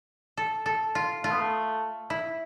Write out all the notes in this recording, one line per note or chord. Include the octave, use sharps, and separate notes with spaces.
A4
A4
F4
A3 F4
B3
A3
E4